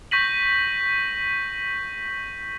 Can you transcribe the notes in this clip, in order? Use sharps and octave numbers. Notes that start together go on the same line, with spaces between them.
C#6 G6 A#6 B6 D#7 F#7